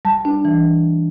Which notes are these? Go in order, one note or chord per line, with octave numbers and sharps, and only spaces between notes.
G3 A5
D4
E3